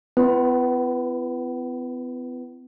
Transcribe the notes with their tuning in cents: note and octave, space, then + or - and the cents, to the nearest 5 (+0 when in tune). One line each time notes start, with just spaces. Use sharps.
B3 +40 E4 +45 B4 +0